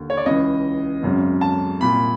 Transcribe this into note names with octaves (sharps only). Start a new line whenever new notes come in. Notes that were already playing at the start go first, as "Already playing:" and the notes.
Already playing: D#2 D3
C#5
D5
C#2 C#3 E3 D#5
G#1 F#2 C#3
A5
C2 A#2 B5